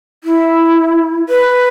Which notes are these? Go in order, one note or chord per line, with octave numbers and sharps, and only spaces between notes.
E4
B4